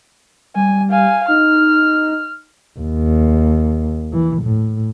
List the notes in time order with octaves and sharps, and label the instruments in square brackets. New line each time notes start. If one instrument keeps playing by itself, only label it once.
[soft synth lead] G3 [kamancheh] G#5
[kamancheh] F5 G#5
[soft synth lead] D#4 [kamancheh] F6
[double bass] D#2
E3
A2